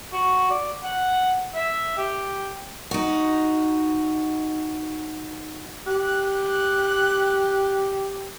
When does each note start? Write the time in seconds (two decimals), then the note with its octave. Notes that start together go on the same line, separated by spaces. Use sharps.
0.13 F#4
0.51 D5
0.84 F#5
1.55 E5
1.98 G4
2.91 D#4 F#4
5.87 G4 F#6